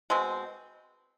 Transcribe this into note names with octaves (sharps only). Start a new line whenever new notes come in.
B2 G#3 C4